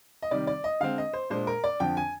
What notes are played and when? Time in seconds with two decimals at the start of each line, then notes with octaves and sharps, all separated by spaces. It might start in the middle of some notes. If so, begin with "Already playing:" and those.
0.22 D#5
0.31 C3 D#3 G3 D5
0.47 D5
0.64 D#5
0.80 D3 G#3 C4 F5
0.98 D#5
1.13 C5
1.30 A#2 G#3 D4 C5
1.47 A#4
1.64 D5
1.80 F2 D3 F3 G5
1.97 G#5